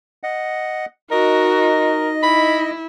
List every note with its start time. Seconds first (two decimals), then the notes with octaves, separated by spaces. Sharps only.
0.23 D#5 F#5
1.11 D#4 F#4 A#4 D#5
2.23 E4 B5